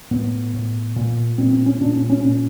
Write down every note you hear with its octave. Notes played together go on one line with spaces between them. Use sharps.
A2 B3
A2
A#2
A#2 C4
C4
C#4
A#2 D4
C#4
C#4
A#2 C#4